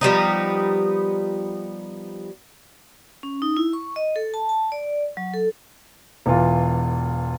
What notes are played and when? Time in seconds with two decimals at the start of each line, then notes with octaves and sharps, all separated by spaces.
0.01 F3 G3 B3 D#4
3.23 C#4
3.42 D#4
3.57 E4
3.73 C#6
3.96 D#5
4.16 A4
4.34 A5
4.49 A5
4.72 D5
5.17 F#3
5.34 A4
6.26 E1 E3 F4